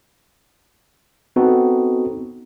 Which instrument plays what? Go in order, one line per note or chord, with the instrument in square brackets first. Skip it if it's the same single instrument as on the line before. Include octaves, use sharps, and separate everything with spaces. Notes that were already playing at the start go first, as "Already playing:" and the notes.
[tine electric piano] B3 C4 D#4 F#4 A4